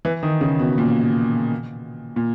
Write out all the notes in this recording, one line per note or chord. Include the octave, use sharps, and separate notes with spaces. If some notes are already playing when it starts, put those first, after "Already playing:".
E3
D#3
C#3
B2
A#2
A#2